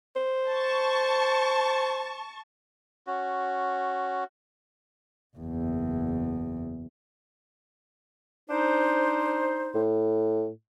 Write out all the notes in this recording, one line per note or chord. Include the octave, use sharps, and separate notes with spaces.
C5
A5 C#6
C#4 F#4
F#1 E2
D4 D#4 C5
A2